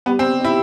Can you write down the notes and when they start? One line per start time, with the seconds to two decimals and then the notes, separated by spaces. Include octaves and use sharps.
0.06 G3 B3
0.19 C4
0.23 G3
0.40 D#4 E4